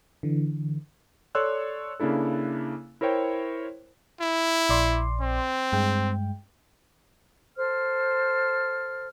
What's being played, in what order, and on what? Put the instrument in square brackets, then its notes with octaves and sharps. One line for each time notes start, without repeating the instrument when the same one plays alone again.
[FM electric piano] D3 E3
[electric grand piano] A4 C#5 D5 C6 E6 F#6
C#3 A#3 D4 E4 A4
E4 A#4 C5 C#5 G5
[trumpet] E4
[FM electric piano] A#1 D5 C6
[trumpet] C4
[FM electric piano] G2 G#3 G5
[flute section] A4 C5 F6